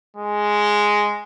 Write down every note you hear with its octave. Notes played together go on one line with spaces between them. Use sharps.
G#3